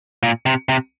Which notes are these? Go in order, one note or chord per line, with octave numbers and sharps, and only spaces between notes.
A#2
C3
C3